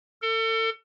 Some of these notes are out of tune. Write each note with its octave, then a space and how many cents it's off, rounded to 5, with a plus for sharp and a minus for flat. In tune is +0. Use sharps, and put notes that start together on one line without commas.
A4 +35